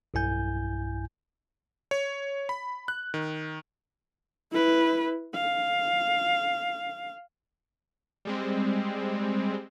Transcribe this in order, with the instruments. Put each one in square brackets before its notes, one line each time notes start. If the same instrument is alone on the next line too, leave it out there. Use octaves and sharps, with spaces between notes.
[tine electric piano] B1 G2 E4 G#5 G6
[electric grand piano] C#5
B5
F#6
D#3
[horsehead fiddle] E4 B4
F5
[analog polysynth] G3 G#3 C4